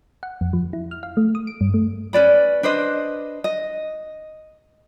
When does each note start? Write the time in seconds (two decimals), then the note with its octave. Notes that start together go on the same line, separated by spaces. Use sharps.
0.23 F#5
0.41 F2
0.53 F3
0.73 E4
0.91 F6
1.03 F5
1.17 A3
1.35 D#6
1.47 D7
1.61 G2
1.74 A3
2.13 C#4 B4 D5 B5
2.63 D4 B4 C5 D#5
3.44 D#5